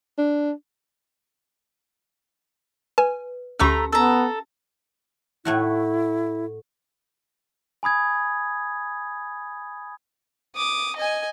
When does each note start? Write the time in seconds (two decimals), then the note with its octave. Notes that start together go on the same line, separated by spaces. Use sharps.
0.18 D4
2.98 B4 G#5
3.60 D2 A3 C#4 G4 A#5 B5 C#6 E6
3.93 B3 A4 A#5
5.45 A2 A3 E4 F#4
7.83 G#5 B5 D#6 G#6
10.55 D6 D#6
10.96 D#5 G#5